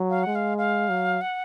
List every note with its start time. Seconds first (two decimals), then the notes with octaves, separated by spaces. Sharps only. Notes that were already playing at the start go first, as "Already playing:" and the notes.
Already playing: F#3
0.10 F5
0.23 G#3 F#5
0.35 F5
0.58 F5
0.90 F#3
1.21 F#5